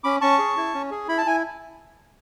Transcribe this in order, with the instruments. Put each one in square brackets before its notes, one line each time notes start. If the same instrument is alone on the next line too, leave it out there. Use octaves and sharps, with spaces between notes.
[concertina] C#4 B5 D6
C#4 A5 C#6
G#4
E4
C#4
G#4
E4 B5
A5
E4 G#5